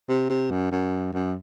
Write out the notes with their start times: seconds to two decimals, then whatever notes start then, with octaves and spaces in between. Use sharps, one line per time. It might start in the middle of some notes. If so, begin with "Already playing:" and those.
0.09 C3
0.30 C3
0.51 F#2
0.71 F#2
1.13 F#2